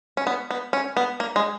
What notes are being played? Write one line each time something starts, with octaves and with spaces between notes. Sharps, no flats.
C#4
B3
B3
C#4
B3
A#3
G#3